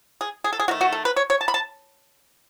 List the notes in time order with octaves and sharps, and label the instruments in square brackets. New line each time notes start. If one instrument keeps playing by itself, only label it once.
[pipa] G#4
G#4
A4
G#4
D#3 A3 F#4
F#4
A4
B4
C#5
C#5
A5
B5
A5